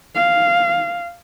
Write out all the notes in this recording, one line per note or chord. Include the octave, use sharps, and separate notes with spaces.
F5